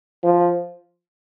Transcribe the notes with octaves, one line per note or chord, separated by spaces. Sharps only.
F3